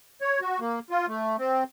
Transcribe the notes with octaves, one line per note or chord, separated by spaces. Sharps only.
C#5
F#4
A#3
F4
A3
C4